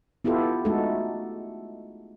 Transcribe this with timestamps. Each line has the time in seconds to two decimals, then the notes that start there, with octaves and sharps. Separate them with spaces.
0.24 B3 E4 F4 G4 A4
0.65 G#3 A3 D#4 F#4 A4